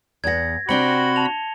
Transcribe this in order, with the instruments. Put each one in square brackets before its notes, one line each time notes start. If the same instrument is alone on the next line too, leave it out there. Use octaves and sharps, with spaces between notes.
[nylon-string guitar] E2 F#5 [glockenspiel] G#6 A#6
[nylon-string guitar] C3 C4 D4 [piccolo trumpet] F#4 [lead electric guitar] B5 [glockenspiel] C#7 G7
[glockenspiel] A5 F7